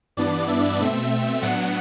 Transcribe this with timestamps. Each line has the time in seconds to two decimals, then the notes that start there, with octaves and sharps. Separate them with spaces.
0.17 G2 E3 B3 D4 D5
0.48 E5
0.79 B2 A3 C4
1.42 A2 F#3 B3 D4 F#5